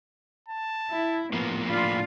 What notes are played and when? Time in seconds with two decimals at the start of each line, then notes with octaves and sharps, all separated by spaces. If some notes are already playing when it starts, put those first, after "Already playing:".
0.48 A5
0.91 E4
1.33 A2 F3 A#3 B3
1.68 D4 F4 F5 B5